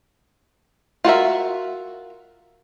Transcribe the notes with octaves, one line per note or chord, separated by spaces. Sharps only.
F4 F#4 A#4 E5